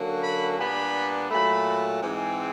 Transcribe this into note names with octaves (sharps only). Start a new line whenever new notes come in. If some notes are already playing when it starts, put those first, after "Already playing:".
Already playing: D3 F#3 A#3 C#4
B5
A#2 G3 B3 D4 B5
A#2 F#3 A3 B5
G#2 E3 G#3 C4